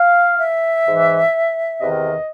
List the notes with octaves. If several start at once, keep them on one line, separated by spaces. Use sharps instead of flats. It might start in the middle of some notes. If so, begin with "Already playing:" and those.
Already playing: F5
E5
G#2 E3
E2 C3 D#3 D#5